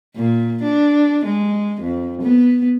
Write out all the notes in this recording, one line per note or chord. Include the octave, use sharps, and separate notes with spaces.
A#2
D4
G#3
F2
B3